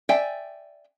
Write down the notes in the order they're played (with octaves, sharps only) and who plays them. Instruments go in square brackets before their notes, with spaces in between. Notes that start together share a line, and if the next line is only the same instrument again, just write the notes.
[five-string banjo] D5 E5 G5 G#5